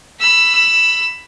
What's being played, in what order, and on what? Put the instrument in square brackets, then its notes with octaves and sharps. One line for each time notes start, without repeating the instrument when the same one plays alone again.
[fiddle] B5 E6